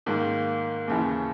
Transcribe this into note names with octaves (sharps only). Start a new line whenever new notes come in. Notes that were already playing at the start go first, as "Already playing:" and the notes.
G#2 D#3 A#3
D#2 C#3 E3